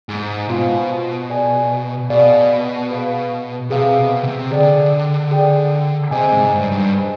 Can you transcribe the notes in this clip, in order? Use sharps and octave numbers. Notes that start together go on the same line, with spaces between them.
G#2
B2 B3 F4 C5 F5 G#5
G#4 D5 F5 G#5
B2 G#4 D5 F5 G#5
G#4 B4 F5
C3 G#4 B4 F5
B2
C3
D3 G#4 D5 G5
G#4 D5 G5
C3 G#4 C5 D#5 G#5
G#2
G2
G2
G#4 C5 D#5 G#5